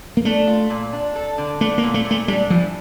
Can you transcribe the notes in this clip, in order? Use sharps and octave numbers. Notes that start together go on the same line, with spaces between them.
A#3
A3 D4
F4
A#2
D4
A4
D3
A3 D4
A#3
A#2
A3
A#2
A3
G3 D4
E3 F3